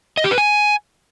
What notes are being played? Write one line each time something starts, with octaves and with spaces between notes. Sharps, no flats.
D#5
G4
B4
G#5